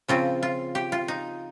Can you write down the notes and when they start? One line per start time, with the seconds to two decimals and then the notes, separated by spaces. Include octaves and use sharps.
0.08 C#3 F3 C4 F4
0.43 F4
0.75 G4
0.92 F4
1.08 D#4